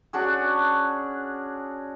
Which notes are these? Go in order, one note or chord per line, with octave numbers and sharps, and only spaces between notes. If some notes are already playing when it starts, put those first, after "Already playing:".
C#4 D4 F#4 G#4